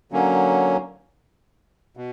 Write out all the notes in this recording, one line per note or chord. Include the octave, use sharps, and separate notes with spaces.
D3 F#3 A#3 C#4
B2